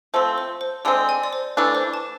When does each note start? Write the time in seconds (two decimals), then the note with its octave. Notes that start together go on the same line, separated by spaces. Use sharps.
0.14 F3 A3 C4 C5
0.38 C5
0.61 C5
0.85 D3 G#3 C4 D5
1.09 G#5
1.23 D5
1.33 C5
1.57 E3 A3 D4 B4
1.75 C5
1.94 A5